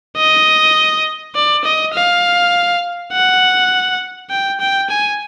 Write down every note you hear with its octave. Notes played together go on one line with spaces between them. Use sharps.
D#5
D5
D#5
F5
F#5
G5
G5
G#5